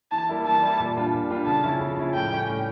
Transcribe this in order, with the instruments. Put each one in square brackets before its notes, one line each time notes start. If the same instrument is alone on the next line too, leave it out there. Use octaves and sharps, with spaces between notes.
[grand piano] E3 [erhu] A5
[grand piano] G3 A#3 E4
[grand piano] E3 [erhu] A5
[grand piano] G3 A#3 E4
A#2
G3 D4 F4
A#2
G3 D4 F4
[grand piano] C#3 [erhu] A5
[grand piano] F3 C#4 E4
C#3
F3 C#4 E4
[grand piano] A2 [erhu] G5
[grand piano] G3 C#4
A2